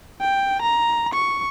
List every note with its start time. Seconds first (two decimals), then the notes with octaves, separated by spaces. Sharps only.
0.21 G5
0.62 A#5
1.14 C#6